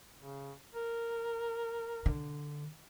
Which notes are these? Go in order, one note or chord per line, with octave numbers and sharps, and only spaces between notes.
C#3
A#4
D3